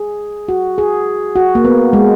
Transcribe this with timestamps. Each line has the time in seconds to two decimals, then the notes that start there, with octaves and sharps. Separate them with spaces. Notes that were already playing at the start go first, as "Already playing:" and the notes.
Already playing: G#4
0.49 F#4
0.78 G#4
1.36 F#4
1.55 A#3
1.65 B3
1.93 G#3